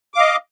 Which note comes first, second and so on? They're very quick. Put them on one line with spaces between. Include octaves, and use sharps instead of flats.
D6 F5 D#5